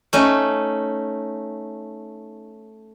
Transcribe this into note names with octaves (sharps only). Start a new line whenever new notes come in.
A3 C#4 D#4